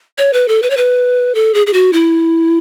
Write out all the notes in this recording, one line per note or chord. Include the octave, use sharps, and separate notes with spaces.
C#5
B4
A4
B4
C#5
B4
A4
G#4
G#4
F#4
E4